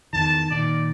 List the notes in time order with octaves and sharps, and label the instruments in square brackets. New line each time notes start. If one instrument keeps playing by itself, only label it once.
[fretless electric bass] E2 D#3 [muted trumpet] A5
[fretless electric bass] A#2 D#3 [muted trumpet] D5